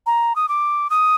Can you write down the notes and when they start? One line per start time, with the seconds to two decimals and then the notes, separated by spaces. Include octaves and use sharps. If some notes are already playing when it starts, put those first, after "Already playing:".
0.06 A#5
0.36 D#6
0.48 D6
0.90 D#6